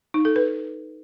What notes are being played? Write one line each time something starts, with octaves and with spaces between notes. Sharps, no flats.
D#4
A4
B4